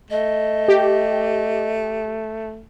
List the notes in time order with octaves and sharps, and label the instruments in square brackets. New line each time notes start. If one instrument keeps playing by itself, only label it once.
[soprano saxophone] A3 [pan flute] D#5
[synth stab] G4